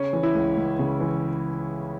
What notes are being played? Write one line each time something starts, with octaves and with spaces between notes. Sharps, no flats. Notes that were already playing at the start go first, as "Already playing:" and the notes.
Already playing: C#3 C#4
E3
E4
C#2
C#2
C#3
E3